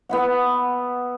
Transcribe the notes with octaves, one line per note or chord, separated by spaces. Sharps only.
B3 E4 F#5